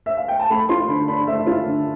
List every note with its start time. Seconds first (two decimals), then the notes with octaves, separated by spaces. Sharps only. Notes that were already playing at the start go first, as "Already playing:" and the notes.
0.06 E5
0.17 F5
0.28 G5
0.39 A5
0.50 A3 B5
0.69 F4 C6
0.88 D3 B5
1.08 D4 B5
1.27 A3 E5
1.47 F4
1.66 D3